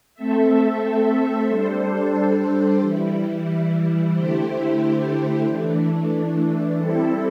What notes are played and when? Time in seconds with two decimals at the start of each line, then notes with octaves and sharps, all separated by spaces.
0.14 A3 C4 A4 E5
1.48 G3 D4 A4 C5
2.80 E3 G3 E4
4.12 D3 A3 E4 G4 C5
5.46 E3 A3 D4
6.78 G3 C4 E4 A4